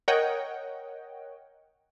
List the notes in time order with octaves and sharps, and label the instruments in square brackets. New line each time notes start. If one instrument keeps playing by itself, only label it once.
[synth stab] A#4 C#5 D#5 F#5 G5